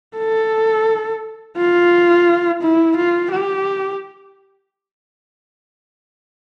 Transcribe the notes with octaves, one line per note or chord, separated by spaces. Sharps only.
A4
F4
E4
F4
G4